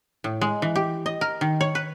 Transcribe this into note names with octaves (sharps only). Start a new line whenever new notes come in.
A2
G#3
E3
G4
D#5
A#4
D#3
C#5
B4